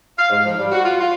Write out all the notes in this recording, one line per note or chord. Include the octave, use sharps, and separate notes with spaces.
F5
G#2
F3
G3
F#4
F4
F4